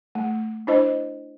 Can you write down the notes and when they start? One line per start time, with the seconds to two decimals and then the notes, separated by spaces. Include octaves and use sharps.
0.15 A3
0.67 D4 E4 C5 D#5